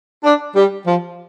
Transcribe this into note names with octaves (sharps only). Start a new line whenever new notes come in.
D4
G3
F3